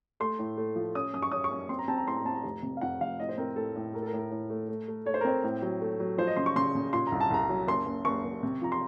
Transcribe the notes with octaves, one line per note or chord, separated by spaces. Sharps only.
A3 C6
A2
A3
F3
C#4 D#6
F#2 D#6
C#6
C#4 D#6
C#6
F#2
C4 C6
A#5
C4 A5
A#5
A2 C6
A#5
C4 A5
A#5
F1
C3
F5
F2 F#5
F1 F5
A2 D#5
C5
C4 A#4
A2 A4
A2
A3 A#4
A4
A#4
A2
A#4
A2
A3
A3
A3
A3 C#5
C5
A#4
C4 C5
A2
F#3
A3
F#3
F3 C5
D#5
C#3 C6
C#6
C#3 C6
C#3
A#2 C6
A#5
C2
A5
C2 A#5
F#3
F#1 C6
F#1
F#1 C#6
F#1
C3
F3 A#5
C6